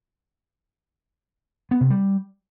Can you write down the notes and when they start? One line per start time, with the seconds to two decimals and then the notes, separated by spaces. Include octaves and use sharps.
1.71 B3
1.81 C3
1.90 G3